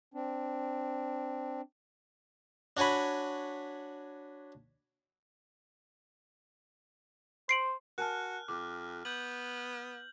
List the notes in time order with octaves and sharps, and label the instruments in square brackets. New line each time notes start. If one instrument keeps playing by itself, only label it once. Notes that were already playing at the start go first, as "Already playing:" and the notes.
[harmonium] C4 D4
[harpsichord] D4 F#4 C#5 G#5 B5
[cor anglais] C5 [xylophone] C7 D7 F#7
[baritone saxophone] F#4 [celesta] A#4 G#5 A5 [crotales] F6 F#6
[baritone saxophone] F2 [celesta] D6
[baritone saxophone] B3 [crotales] G6 F#7